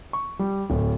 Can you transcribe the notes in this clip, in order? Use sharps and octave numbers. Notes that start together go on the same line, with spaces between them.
C#6
G3
D1